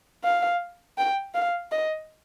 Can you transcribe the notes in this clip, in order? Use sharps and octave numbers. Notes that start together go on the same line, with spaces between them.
F5
G5
F5
D#5